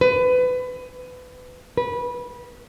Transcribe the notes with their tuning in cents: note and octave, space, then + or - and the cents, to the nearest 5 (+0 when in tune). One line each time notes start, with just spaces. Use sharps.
B4 +25
B4 -20